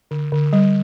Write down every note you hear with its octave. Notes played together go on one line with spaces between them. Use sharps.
D3
D3
G3